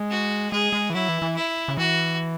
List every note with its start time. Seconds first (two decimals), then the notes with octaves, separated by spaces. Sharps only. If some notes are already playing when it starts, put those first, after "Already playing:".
Already playing: G#3
0.11 F#4
0.52 G#3 G#4
0.73 G#3
0.90 E3
0.94 F#3 E4
1.09 E3
1.22 E3
1.36 E4
1.68 C#3
1.77 E3 F#4